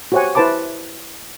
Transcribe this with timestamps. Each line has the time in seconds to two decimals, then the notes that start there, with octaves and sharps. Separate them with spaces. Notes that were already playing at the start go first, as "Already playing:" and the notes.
0.12 F#4 G4 C5 C#5 F#5 G#5
0.35 E4 B4 C5 A5 B5 D6